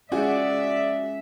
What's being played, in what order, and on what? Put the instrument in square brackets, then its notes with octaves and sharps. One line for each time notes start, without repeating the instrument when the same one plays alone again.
[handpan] G#3 C#4 [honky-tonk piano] F4 F#4 G#4 [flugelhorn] D5 [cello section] E5